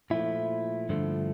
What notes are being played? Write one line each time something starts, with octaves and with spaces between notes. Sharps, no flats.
A#2 F3 A3 E4
G2 D3 F3 A3